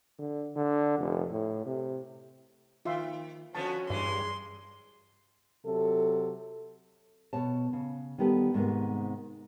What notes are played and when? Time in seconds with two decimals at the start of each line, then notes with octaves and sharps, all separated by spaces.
0.19 D3
0.56 D3
0.98 F1
1.31 A2
1.66 C3
2.85 D#3 F4 E5 C6
3.55 D3 F3 B3 C#4 F#4 A5
3.90 G2 E3 G#3 C6
5.65 C3 F#3 A4
7.33 B2 C#5 A5
7.73 C#3
8.18 D#3 G3 B3 G4 A4
8.54 G#2 C3 D#3 G#3 B3